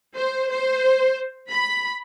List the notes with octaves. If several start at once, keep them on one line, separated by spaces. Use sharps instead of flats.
C5
C5
B5